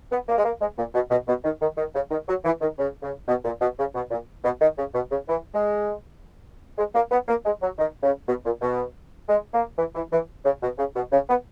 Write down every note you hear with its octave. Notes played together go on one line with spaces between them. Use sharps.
B3
A#3
G#3
A#3
G#3
A#2
B2
B2
B2
D#3
D#3
D#3
C#3
D#3
F#3
E3
D#3
C#3
C#3
B2
A#2
B2
C#3
B2
A#2
B2
D#3
C#3
B2
C#3
E3
G#3
G#3
A#3
B3
A#3
G#3
F#3
D#3
C#3
B2
A#2
B2
G#3
A#3
E3
E3
E3
C#3
B2
C#3
B2
C#3
B3